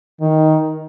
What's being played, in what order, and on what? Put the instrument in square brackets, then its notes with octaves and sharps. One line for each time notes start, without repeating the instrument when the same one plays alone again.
[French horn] D#3